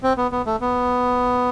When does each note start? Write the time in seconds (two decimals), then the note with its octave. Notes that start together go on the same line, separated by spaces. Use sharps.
0.03 C4
0.17 B3
0.32 B3
0.46 A3
0.61 B3